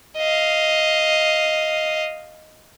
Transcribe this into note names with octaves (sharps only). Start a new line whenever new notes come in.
D#5 F5